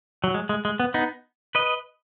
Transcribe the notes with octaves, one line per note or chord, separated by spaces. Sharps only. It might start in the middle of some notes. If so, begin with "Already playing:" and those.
F#3
G#3
G#3
G#3
B3
B3 D#4
B4 D#5